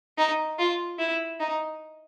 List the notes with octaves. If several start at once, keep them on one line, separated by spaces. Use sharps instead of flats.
D#4
F4
E4
D#4